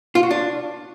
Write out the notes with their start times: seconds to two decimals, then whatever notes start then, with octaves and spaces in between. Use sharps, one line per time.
0.15 F4
0.23 F#4
0.31 D4